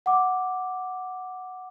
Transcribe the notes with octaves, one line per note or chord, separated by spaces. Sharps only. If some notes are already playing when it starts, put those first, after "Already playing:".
F#5 D6